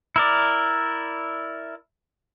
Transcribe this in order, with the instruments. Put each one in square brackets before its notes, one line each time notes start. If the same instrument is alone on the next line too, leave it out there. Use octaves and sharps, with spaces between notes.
[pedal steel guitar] E4 A#4 D5